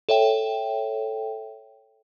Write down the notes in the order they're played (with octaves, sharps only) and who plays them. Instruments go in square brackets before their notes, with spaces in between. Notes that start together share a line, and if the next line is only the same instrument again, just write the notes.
[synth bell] A4 C#5 E5 G5